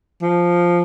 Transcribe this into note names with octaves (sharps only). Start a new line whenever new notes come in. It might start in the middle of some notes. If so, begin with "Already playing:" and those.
F3